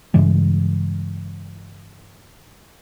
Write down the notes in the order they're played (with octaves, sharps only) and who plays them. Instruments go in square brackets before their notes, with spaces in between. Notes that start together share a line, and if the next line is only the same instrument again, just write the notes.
[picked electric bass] G2 C#3 E3 G#3